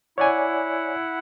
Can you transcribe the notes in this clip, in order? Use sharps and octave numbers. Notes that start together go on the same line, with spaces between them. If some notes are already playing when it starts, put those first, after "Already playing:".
E4 C#5 D5 F#5 G#5